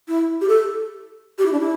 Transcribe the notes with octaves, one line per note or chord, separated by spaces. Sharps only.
E4
G4
A4
G4
E4
D4
E4